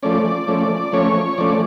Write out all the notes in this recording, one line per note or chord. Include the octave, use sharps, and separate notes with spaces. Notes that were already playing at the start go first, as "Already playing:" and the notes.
F3 A3 C#4 D5
F3 A3 C#4
F3 A3 C#4 C#5
F3 A3 C#4 D5